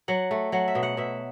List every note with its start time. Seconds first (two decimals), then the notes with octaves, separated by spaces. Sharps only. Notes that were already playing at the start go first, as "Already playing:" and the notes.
0.08 F#3 F#5
0.31 A3
0.52 F#3 F#5
0.68 E5
0.75 B2
0.83 F#5
0.97 B2 E5